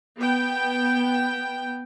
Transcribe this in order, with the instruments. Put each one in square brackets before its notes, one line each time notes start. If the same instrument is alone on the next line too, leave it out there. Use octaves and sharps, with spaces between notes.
[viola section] B3 G5